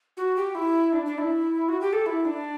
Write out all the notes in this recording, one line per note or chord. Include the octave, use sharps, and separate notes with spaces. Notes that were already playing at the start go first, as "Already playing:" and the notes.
F#4
G4
E4
D4
D4
E4
F#4
G4
A4
E4
D4